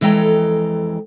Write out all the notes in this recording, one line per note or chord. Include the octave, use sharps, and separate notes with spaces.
F2 E3 G#3 A4 G5 A#5